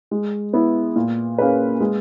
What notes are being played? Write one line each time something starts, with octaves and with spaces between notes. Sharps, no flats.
G#3
B3 E4
A#2
A#3 C#4 G#4 B4
G#3